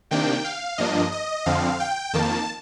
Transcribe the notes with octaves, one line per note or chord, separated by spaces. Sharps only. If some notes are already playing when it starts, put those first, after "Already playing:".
C3 D#3 A#3 D4 G5
F5
G2 F3 A#3 D4 D#5
D#5
F2 D3 F3 C4 F5
G5
F2 D#3 A#3 A5